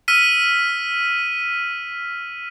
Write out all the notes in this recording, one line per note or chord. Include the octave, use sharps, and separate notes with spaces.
E6 F6 B6 D#7